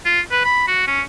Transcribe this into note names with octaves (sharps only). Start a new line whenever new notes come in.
F4
B4
B5
F#4
C#4